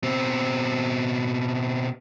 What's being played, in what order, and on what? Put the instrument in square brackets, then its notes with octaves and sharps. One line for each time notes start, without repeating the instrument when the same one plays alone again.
[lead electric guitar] B2 C4